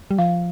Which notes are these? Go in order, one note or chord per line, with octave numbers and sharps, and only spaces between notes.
G3
F3 F5